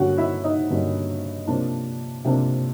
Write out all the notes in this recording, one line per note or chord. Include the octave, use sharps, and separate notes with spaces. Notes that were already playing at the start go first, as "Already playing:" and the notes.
Already playing: G2 D3 F#3 A#3 C#4 F#4 F#5
E4 E5
D#4 D#5
G2 D3 F#3 A#3 C#4
C3 F3 A#3 D4
C3 F3 A#3 D4